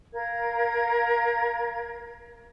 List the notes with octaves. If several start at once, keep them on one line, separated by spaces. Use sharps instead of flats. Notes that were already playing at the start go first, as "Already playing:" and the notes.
A#4 F5 G#6